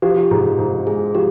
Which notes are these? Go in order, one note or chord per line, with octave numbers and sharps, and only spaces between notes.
F3 G4
G#2
G#2
G#3 G#4
F3 G4